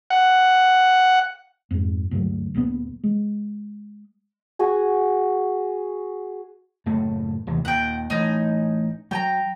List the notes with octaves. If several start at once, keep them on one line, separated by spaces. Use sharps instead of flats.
F#5
F2 G#2
D2 G2 F3 F#3
D1 A#1 A#2 B3
G#3
F#4 G#4 G#5
F#1 A2 A3
F1 D#2 E3
D#2 A#2 F#5 G5
A1 D#4 G#5
F#3 G5 G#5 A#5